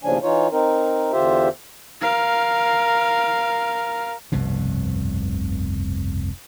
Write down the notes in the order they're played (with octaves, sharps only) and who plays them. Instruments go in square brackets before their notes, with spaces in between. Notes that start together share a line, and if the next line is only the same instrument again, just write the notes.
[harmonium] D#2 A2 C#3 F3 D4 G#5
E3 D#4 F4 C#5
C4 D#4 A#4
E2 D3 F4 G4 C5 E5
[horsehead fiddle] A#4 F5
[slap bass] F1 C2 G2 B2